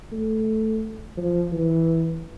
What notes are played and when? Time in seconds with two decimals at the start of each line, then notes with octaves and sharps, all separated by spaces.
0.12 A3
1.17 F3
1.52 E3